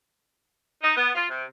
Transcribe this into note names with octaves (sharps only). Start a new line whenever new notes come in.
D#4
B3
F4
C3